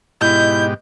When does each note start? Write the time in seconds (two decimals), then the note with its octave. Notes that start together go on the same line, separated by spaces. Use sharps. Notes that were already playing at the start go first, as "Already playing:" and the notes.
0.21 G#2 B2 E4 G4 D#5 G6